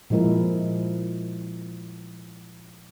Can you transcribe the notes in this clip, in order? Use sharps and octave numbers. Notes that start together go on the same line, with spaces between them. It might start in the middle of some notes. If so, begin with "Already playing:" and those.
A#2 F3 G#3 E4 A#4